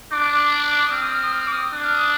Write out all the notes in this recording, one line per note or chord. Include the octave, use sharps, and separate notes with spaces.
D4 D6
D#6
C4 F6
D#6
F6
D#6
F6
D6
D#6
D4
F6
D#6